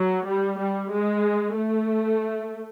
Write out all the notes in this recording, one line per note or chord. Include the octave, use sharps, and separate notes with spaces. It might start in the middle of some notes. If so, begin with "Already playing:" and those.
Already playing: F#3
G3
G3
G#3
A3